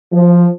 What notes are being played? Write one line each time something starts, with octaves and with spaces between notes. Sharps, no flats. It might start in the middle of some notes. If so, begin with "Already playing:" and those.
F3